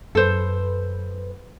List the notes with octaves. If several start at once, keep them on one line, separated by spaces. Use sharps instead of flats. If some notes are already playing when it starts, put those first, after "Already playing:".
F#2 A4 B4 C5